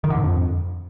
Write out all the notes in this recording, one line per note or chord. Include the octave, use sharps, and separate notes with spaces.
D#3
D3
G#2
F2